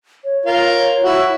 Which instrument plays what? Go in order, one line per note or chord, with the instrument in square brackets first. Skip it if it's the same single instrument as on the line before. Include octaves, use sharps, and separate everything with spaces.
[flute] C#5
[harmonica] F4 A#4
E4 F#4